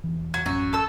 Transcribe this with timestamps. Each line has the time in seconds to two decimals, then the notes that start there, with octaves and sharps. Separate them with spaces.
0.04 E1 E3
0.34 F#3 G#6
0.46 A1 F#2 F#4
0.73 A4 E6